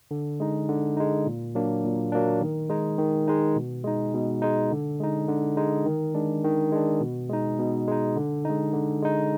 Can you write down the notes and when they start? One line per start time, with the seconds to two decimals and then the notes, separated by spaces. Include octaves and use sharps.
0.11 D3
0.40 G#3 D#4
0.69 D3
0.97 G#3 D#4
1.26 A#2
1.55 F#3 A#3 D4
1.84 A#2
2.12 F#3 A#3 D4
2.41 D#3
2.70 G#3 D#4
2.99 D#3
3.28 G#3 D#4
3.56 B2
3.84 G#3 D#4
4.14 B2
4.42 G#3 D#4
4.71 D3
5.00 G#3 D#4
5.29 D3
5.57 G#3 D#4
5.86 D#3
6.15 G#3 D4
6.44 D#3
6.72 G#3 D4
7.01 B2
7.29 G#3 D#4
7.58 B2
7.87 G#3 D#4
8.16 D3
8.45 G#3 D#4
8.73 D3
9.02 G#3 D#4